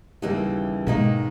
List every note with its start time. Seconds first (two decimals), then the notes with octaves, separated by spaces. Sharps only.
0.22 D#2 C#3 E3 G3 A#3
0.87 G#2 B2 D#3 A#3 D#4